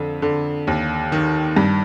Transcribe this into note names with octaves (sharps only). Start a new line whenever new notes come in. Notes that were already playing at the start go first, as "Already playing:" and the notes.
Already playing: F2 D3
D3
D#2
D#3
G2